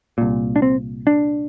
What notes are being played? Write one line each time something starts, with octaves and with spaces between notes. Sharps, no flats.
C2 A#2
D4
C4
D4